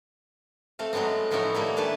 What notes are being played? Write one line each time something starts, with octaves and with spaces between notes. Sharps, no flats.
A3 C4 F5
F#3 G#3 A3 B3 C4
A2 F3 B3 D#4 E4 C#5
D#3 G3 A3 A#3
A3 D4 B4 G#5 A5